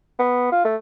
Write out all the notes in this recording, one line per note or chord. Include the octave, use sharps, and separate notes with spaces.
B3
F4
A3